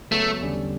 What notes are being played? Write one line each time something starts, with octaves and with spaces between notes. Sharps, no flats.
C#3 F#3 A3 B3 F#4
E2 D3 G3 C#4